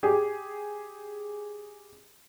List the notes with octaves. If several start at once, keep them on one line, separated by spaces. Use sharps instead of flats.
G4 G#4